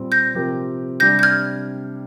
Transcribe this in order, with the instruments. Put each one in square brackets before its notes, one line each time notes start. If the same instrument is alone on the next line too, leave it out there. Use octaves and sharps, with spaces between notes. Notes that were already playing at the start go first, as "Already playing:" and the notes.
Already playing: [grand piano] A#2 G3 C4
[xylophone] G6 A#6
[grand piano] C3 F3 C4 G4 A#4
[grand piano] C3 G3 D4 G4 [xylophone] G6 A#6
[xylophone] G6
F6 G#6